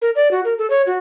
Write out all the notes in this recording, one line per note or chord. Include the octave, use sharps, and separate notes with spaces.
A#4
D5
F#4
A#4
A4
C#5
F#4